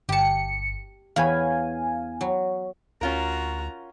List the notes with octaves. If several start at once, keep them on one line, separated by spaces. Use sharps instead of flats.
G1 G4 A5 C#7
E2 C#5 F5 G#5 B5
F#3
D2 C#4 F4 F#4 A#4 A#5